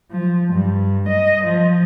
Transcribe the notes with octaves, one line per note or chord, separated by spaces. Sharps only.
F3
G2
D#5
F3